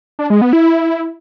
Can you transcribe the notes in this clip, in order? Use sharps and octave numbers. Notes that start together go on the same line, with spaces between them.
D4
G#3
B3
E4